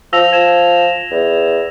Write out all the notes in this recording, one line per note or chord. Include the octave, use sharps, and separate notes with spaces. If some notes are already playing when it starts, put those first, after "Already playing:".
F3 E6 A#6 F7
F3 G#6 E7
E2